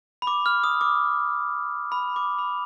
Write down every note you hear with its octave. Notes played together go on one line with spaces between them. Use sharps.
B5
D6
F6
D#6
D6
B5
D6
B5